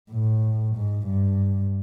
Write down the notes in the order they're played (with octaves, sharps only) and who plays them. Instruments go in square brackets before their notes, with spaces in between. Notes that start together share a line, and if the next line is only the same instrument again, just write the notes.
[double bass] A2
G#2
G2